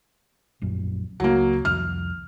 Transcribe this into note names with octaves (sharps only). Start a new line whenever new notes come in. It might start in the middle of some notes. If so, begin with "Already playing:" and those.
A#1 F#2
C#2 F#3 A#3
C2 F2 F6